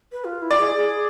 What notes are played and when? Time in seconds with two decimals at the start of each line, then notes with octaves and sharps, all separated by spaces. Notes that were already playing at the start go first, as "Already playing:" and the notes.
0.12 B4
0.25 F4
0.42 E4
0.51 D5
0.59 G#4
0.77 G#4